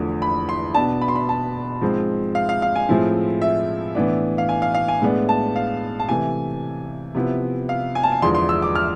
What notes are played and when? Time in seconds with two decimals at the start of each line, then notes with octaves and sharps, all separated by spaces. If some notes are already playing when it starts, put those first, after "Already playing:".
Already playing: E2 D3 F3 A3
0.22 B5
0.49 C6
0.74 B2 B3 D4 A5
1.02 B5
1.08 C6
1.15 B5
1.29 A5
1.81 G#2 F3 G#3 C4
2.35 F5
2.49 F5
2.62 F5
2.76 G#5
2.89 A2 F3 G#3 C4 E4
3.42 E5
3.95 A2 E3 B3 D4
4.38 F5
4.49 G#5
4.62 F5
4.75 F5
4.88 G#5
5.02 A2 G#3 B3 D4
5.29 A5
5.56 F5
6.00 A5
6.08 C3 E3 A3 G#5
7.15 C3 F3 B3 E4
7.69 F5
7.95 G#5
8.03 A5
8.12 G#5
8.21 E2 D3 F3 G#3 D4 C6
8.35 C6
8.49 E6
8.62 D6
8.76 F6